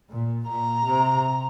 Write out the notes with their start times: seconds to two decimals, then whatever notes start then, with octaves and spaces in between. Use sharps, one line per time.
0.12 A#2
0.49 A#2 A#5
0.86 C3